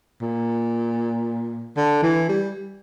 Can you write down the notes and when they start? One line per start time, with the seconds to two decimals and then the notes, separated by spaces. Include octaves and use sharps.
0.21 A#2
1.76 D3
2.03 E3
2.29 G3